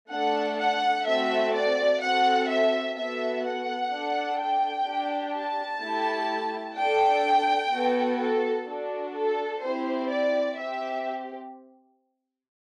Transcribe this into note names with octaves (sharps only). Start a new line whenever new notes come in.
A3 D4 A4 F#5
F#5
A3 C4 F#4 A4 E5
D5
C4 F#4 A4 F#5
E5
B3 F#4 A4 E5
F#5
D4 A4
G5
D4 G4
A5
A3 E4 G4
D4 A4 G5
B3 F#4 A4
A4
D4 F#4 A4
A4
C4 E4 G4 C5
D5
C4 G4 E5